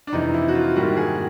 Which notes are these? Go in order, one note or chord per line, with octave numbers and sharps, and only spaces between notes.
D4
F2 C3 E3 D#4
E4
F#4
F4
G#2 D#3 G3 A#3 F#4
G#4